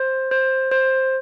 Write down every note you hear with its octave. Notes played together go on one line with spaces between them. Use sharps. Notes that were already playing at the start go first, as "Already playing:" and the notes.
Already playing: C5
C5
C5